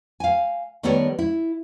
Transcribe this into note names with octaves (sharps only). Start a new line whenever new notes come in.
F5 G#5
D#3 G3 B3 A4 A#4 C#5
E4